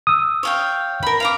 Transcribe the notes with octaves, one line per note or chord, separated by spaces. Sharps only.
D#6 E6
C#5 F5 G5
A#4 B5
F5 A#5 D6